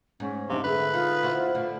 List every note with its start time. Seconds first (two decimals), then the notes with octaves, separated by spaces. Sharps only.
0.20 G#2 C#4
0.50 C3 D4 D#4 F5
0.64 D3 G#4 B4 E5
0.94 D#4 F4
1.23 E4 F#4 C5
1.55 A2 D3 F5